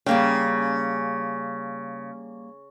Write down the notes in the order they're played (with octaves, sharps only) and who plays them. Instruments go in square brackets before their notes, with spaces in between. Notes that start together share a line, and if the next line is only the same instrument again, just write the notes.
[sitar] C#3 [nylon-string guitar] G3 A#3 G5